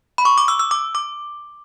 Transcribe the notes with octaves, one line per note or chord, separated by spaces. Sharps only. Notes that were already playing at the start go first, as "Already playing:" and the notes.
B5
C#6
D6
E6
E6
D6
D6